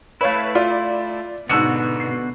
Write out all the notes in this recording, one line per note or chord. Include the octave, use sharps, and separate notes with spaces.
A3 E4 B4 C#5 F5
F4 D5
G#2 B2 D3 B3 F#4 E6 C#7
C7